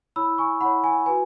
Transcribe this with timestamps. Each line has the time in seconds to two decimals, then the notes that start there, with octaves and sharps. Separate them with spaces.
0.16 E4 C#5 B5 E6
0.38 G#5 C#6
0.61 E4 C#5 F#5 B5
0.84 G#5
1.06 F#4 B4 G#5